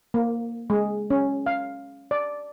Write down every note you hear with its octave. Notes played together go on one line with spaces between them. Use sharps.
A#3
G#3
C#4
F5
D5